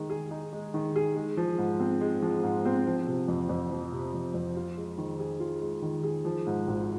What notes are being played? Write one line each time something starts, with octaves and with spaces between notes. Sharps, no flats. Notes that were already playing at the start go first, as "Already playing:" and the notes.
Already playing: D#3 G#3 D#4
G#4
D#4
G#3
D#3
G#4
G#3
F3
G#2
C4
G#3
F3
G#2
C4
F3
C3
F2
F2
F3
C3
F2
F2
F4
G#3
D#3
G#4
F4
G#3
D#3
G#4
F3
G#2
G#1